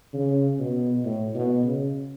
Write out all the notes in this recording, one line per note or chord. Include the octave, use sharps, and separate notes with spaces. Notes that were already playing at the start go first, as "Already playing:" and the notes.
C#3
B2
A2
B2
C#3